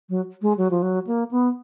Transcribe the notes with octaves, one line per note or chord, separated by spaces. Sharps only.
F#3
G#3
F#3
F3
F#3
A#3
B3